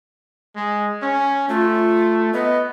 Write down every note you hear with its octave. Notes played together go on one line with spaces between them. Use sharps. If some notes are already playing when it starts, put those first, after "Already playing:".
G#3
C#4
A3 F4
B3 D#5